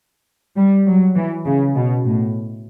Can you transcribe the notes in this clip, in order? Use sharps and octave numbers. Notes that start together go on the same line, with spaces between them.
G3
F#3
E3
C#3
B2
A2